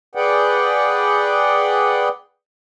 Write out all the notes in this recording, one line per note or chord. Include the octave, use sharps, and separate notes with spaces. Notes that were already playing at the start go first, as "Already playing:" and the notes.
G#4 B4 D5 F#5 G5